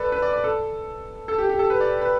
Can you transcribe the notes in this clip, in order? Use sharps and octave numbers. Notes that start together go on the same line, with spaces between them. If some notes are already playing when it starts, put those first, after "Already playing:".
Already playing: A4 B4 D5
B4
D5
D5
A4
A4
G4
G4
A4
B4
D5
B4